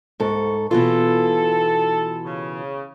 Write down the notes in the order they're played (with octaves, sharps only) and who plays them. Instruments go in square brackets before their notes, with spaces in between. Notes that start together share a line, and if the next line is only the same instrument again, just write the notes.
[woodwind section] C2 C#6 [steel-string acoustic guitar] G#2 A4
[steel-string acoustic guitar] B2 E3 F4 [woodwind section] A4
[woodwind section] C#3